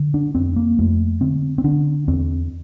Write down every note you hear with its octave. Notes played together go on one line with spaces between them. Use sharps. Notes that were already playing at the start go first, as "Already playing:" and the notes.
Already playing: D3
D4
F2 C4
A#3
F2 A3
D3 C4
C4
D3 D4
E2 C4